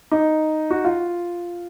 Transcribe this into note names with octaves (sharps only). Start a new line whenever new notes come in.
D#4
F#4
F4